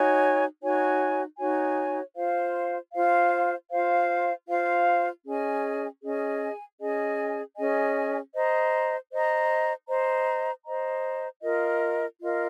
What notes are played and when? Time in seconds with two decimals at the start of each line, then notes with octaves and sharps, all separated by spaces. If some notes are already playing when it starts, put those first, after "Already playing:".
Already playing: D#4 F#4 C#5 G#5
0.61 D#4 F#4 C#5 G#5
1.38 D#4 F#4 C#5 G#5
2.15 F4 C5 F5
2.93 F4 C5 F5
3.71 F4 C5 F5
4.48 F4 C5 F5
5.25 C#4 G#4 D#5 G#5
6.02 C#4 G#4 D#5 G#5
6.79 C#4 G#4 D#5 G#5
7.57 C#4 G#4 D#5 G#5
8.34 C5 D#5 A#5
9.11 C5 D#5 A#5
9.88 C5 D#5 A#5
10.66 C5 D#5 A#5
11.43 F4 A#4 D#5
12.21 F4 A#4 D#5